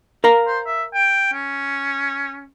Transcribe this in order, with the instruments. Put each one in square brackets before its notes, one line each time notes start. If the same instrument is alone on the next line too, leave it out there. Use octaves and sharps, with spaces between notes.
[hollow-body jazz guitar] A#4 F5 A#5
[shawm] C5
E5
G5
C#4